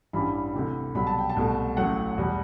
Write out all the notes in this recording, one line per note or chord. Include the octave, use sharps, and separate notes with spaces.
A1 G2 E3 G3 B5
D2 C3 E3
C2 B2 F#3 B5
A5
G5
A5
C2 B2 A3
A1 A2 F#3 A3 F#5
E2 B2 G3